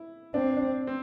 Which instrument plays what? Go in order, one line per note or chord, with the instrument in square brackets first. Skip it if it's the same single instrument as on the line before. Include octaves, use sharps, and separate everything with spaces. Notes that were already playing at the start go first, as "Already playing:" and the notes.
Already playing: [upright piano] E4
[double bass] C4 [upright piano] D4
[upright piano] D4
C4